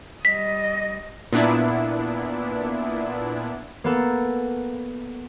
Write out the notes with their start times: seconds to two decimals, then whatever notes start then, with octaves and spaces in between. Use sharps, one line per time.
0.25 G3 D#5 B6
1.33 A#2 B3 D4 E4
3.84 A#3 B3 A4